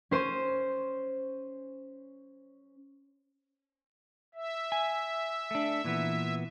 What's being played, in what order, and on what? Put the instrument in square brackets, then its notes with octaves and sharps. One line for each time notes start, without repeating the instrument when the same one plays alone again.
[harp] C#4 C5 D#7
[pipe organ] E5
[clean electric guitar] G#5
A3 D4
A#2 E3 B3